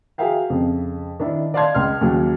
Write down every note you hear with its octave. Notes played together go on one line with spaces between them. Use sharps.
F#4 G#4 A#4 E5 F5 G5
F2 C#3
D#3 D4 E4
D5 D#5 F5 A5 C6 G#6
C#2 C6 F6
D#2 C#3 F#3